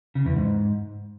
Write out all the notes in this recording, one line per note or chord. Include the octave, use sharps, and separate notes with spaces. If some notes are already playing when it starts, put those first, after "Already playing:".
C#3
E2
G#2